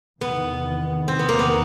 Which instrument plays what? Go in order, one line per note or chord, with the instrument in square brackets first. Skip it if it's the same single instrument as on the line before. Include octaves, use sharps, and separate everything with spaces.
[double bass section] E2 C3 D#3 [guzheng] B3
[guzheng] C4
B3
A#3
B3